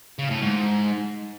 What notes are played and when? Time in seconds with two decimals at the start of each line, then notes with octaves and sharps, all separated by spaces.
0.19 C#3
0.30 A2
0.42 G#2